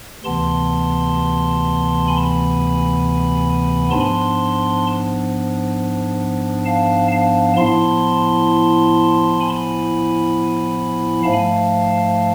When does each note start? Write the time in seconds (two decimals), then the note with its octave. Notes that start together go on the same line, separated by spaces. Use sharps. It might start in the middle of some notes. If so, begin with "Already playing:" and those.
0.24 D2 C3 E3 B3 A5 C6
2.08 G#5 B5
3.91 G#2 F3 B3 D4 A5 C6
6.65 F5 A5
7.12 F5 A5
7.57 A2 F3 B3 E4 A5 C6
9.40 G#5 B5
11.23 G#2 F3 A3 F5 A5